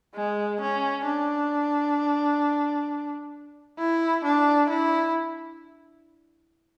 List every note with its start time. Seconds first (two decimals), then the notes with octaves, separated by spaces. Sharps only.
0.15 G#3
0.61 C#4
1.06 D4
3.79 E4
4.24 D4
4.70 E4